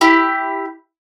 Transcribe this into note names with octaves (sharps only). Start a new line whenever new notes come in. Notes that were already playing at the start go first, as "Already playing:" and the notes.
E4 G4